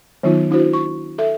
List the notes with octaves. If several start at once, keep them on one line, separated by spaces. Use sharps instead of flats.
D#3 F#3 B3 D#4 F4
D4 E4 F#4 C5
C#6
A4 E5